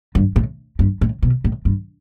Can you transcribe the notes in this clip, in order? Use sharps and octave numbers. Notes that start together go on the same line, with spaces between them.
G2
A2
G2
A2
B2
A2
G2